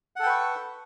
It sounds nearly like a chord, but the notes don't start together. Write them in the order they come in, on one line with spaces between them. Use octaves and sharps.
F#5 A4 G5 B4 C#6